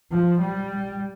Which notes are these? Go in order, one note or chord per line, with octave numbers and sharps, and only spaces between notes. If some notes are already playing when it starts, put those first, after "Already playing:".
F3
G3